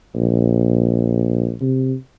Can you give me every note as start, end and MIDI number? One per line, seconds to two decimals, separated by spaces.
0.15 1.54 34
1.61 1.95 48